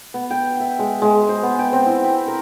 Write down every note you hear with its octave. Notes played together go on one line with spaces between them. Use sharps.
B3
G5
E5
G#3
G#3
C5
B3
G5
C4
E4
B5
A#4